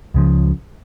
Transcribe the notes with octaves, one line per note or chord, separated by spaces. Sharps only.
C#2 C#3 F3